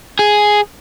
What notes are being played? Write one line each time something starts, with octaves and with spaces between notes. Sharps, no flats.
G#4